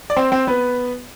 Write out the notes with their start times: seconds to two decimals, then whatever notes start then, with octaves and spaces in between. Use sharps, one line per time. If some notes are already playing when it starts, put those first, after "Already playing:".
0.10 D5
0.16 C4 C5
0.32 C4 C5
0.47 B3 B4